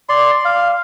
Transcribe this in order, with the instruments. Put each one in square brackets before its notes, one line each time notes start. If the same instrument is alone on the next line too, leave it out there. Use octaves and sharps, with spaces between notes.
[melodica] D5 C6
F5